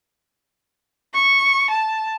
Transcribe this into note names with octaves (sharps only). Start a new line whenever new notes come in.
C#6
A5